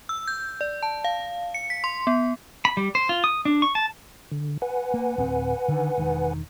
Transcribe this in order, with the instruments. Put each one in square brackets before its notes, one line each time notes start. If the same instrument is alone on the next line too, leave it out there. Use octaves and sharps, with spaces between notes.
[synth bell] E6
G6
D5
A5
F5
C#7
B6
C6
B3
[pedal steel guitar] B5
G3
C5
F4
D#6
D4
C#6
A5
[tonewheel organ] D3
B4 F#5 G#5
[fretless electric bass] A#3
D1 C4
D3 D#3
E1 D#3